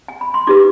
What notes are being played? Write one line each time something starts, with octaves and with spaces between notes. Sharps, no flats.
G#5
B5
C6
D#4 G4 B4 D6